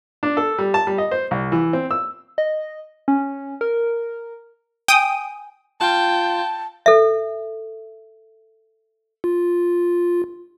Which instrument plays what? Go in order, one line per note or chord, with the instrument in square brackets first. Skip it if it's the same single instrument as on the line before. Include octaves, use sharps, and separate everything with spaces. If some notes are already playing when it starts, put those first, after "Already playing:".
[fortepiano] D4
A4
G3
A5
G3
D#5
C5
C2
E3
C4
E6
[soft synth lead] D#5
C#4
A#4
[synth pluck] G5 D#6 [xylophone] G#5 D7 D#7
[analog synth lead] F4 [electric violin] G5 [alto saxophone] A5
[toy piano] A4 E5
[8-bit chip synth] F4